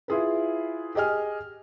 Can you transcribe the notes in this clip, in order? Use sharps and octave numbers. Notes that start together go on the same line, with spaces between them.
E4 F4 G#4 B4
G4 G#4 D#5 G#5 F6